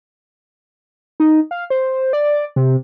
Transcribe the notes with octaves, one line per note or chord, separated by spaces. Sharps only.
D#4
F5
C5
D5
C3